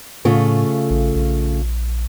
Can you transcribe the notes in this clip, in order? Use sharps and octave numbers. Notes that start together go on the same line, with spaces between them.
A2 C#3 A3 F4
A1
A#1